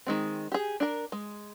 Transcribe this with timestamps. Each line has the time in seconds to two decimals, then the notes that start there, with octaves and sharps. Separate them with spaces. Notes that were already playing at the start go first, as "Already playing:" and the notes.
0.07 D#3 G#3 C4
0.52 G4 G#4
0.80 D4 A#4
1.12 G#3